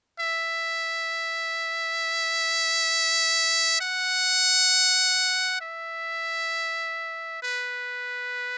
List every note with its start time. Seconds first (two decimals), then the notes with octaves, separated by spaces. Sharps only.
0.20 E5
3.81 F#5
5.61 E5
7.42 B4